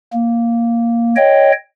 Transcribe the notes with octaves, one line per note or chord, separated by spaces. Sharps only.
A#3
C#5 D#5 G5